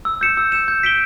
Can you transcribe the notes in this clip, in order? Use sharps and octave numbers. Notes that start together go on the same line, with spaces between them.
E6
G6 C#7 E7
E6
G6 C#7 E7
G6
B6 D7 G7